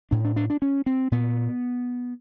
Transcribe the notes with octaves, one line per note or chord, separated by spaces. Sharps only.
A2 D4
D4
D4
D4
C#4
C4
A#2 B3